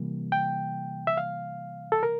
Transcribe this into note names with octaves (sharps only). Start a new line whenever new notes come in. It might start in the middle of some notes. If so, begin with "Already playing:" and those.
Already playing: C3 E3 G3 A#3
G5
E5
F5
A4
A#4